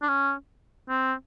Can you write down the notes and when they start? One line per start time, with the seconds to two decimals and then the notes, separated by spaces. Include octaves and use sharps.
0.02 D4
0.08 C#4
0.89 C4